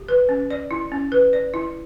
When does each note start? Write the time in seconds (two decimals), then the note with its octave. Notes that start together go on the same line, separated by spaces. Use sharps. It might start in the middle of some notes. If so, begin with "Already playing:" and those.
Already playing: G4
0.09 B4
0.29 C#4
0.50 D5
0.71 E4
0.92 C#4
1.12 B4
1.33 D5
1.54 E4